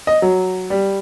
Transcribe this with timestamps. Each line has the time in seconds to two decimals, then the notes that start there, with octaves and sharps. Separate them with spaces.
0.07 D#5
0.22 F#3
0.70 G3